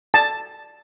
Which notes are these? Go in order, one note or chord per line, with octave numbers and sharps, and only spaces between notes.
A5